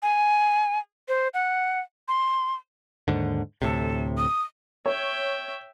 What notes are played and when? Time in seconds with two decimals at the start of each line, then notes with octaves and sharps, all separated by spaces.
0.03 G#5
1.08 C5
1.34 F#5
2.08 C6
3.08 D#2 G#2 D3
3.62 D2 A2 C3 A4
4.18 D#6
4.86 C#5 E5 G5